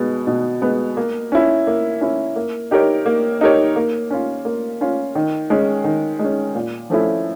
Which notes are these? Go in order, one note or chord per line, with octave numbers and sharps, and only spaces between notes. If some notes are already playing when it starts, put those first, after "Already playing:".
Already playing: B2 G#3 B3
B2
G#3 B3
A#3
C#4 E4
A#3
C#4 E4
A#3
D#4 G4 A#4 C#5
A#3
D#4 G4 A#4 C#5
A#3
C#4 F4
A#3
C#4 F4
D#3
G#3 C#4
D#3
G#3 C#4
A#2
F3 A3 C#4 E4